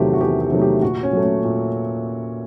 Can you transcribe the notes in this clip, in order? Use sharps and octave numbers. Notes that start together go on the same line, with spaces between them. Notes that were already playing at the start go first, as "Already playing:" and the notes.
Already playing: E2 C3 D#3 F#3 A3 F4 G4
F#4
E2 G4
G4
C3 D#3 F#3 A3
G4
A#2 F#4
C#4
F#3 A3
C#4
A#2